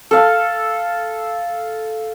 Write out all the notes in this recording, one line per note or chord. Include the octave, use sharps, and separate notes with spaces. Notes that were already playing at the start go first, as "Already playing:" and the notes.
A4 F5